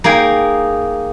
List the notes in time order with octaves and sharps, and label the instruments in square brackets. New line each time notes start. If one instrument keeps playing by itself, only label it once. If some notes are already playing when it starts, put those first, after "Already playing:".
[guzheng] A#3 D#4 G#4 G5